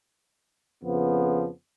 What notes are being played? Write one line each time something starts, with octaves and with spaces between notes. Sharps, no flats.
F2 C#3 F3 B3